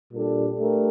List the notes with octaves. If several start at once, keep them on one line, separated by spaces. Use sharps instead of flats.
A#2 G3 D4 A4
A3 D4 G4 A#4